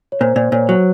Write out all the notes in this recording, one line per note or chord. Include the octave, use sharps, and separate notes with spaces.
C#5
A#2 C5
A#2
A#2 C#5
F#3